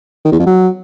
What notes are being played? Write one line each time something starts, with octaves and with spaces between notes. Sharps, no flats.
D#3
E2
F2
F#3